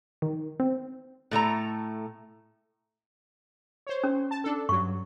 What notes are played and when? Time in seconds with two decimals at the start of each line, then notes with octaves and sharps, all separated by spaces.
0.22 D#3
0.60 C4
1.31 A2 A3 D#4 A#5
3.87 C5 C#5
4.04 C#4
4.31 A5
4.44 D4 A4
4.69 G2 F#3 C#6